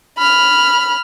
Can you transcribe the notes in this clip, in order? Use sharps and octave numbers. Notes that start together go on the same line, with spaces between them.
B5 F6